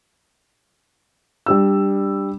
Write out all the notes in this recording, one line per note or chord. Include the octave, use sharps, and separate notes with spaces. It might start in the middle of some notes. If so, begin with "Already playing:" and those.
G3 D4 E6